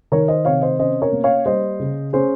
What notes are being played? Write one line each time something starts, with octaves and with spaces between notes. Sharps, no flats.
D#3 A#4 C#5
C5 D#5
C3 C#5 F5
C5 D#5
C#4 C5 D#5
A#4 C#5
A#3
C#5 F5
G3 C5 D#5
C#3
C#4 G#4 C5